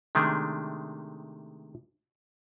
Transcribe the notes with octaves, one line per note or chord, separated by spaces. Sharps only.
C3 D#3 G#3 A3 D4